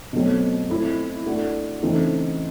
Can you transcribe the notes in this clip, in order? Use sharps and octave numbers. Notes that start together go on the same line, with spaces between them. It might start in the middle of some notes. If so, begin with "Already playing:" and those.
B2 F#3 A3 C4
A3 C4 E4
A3 D4 F#4
C#3 E3 A3 C4 D#4